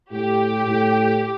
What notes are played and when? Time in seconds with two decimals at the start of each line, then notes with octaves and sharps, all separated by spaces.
0.11 A2 G4
0.66 A2